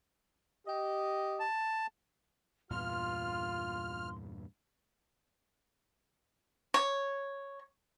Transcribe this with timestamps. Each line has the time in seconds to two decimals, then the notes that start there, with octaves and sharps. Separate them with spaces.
0.67 G4 D#5
1.40 A5
2.71 E2 G2 A#2 F4 C6 F6
6.74 C#5